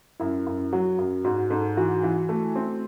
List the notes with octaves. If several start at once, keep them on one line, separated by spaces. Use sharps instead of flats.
F#2 E4
F#2
F#3 F#4
F#2
G#2 F#4
G#2 A4
E3 F#4
E3
A3
C4